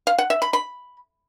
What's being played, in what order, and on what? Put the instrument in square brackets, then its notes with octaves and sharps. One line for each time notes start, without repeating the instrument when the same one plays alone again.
[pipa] F5
F#5
E5
B5
B5